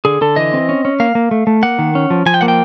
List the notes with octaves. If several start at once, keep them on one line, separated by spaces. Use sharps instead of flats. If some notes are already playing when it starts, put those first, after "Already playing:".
D3 G#4
D3 A4
E3 D#5
C4
C#4
C#4
A#3 F5
A#3
A3
A3
A#3 F#5
D#3
C#4
F3
F3 G#5
G5
A#3 F#5
G5